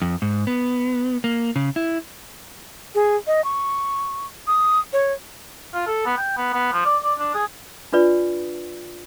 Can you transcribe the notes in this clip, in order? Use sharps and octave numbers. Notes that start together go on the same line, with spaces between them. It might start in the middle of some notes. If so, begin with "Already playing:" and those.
F2
G#2
B3
A#3
C#3
E4
G#4
D#5
C#6
D#6
C#5
F4
A4
B3
G5
B3
B3
F3
D5
D5
D4
G#4
D4 F4 B4 D5